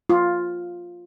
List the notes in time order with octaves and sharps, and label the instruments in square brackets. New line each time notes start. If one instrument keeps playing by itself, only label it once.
[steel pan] F4